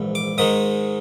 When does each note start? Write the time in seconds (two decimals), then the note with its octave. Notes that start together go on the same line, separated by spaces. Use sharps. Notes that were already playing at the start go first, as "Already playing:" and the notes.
Already playing: A#1 G#2 E3
0.15 D6
0.38 G#2 D#3 G#3 D#6